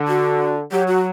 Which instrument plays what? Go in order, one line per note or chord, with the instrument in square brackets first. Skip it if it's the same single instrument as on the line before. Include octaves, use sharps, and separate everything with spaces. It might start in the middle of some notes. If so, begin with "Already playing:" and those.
Already playing: [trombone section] D3
[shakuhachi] F#4
[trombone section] F#3 [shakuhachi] G4
[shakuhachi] F#4